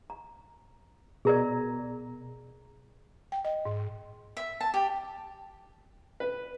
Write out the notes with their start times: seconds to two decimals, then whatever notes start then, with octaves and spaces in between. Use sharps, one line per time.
0.10 A#5
1.25 B2 G#4 A#4 D5 A#5
3.32 G5
3.45 D#5
3.65 G#2
4.37 E5
4.61 A5
4.74 G4
6.20 B4